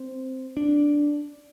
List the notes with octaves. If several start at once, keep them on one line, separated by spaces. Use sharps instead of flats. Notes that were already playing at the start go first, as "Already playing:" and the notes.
Already playing: C4
D4